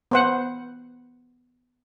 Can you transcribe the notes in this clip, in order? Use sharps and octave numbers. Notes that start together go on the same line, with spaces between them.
B3 C5 F#5